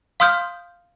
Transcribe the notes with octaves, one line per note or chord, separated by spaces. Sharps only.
F5 C6 D#6 F6 G6